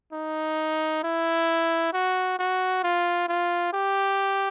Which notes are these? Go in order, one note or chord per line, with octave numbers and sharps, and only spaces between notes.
D#4
E4
F#4
F#4
F4
F4
G4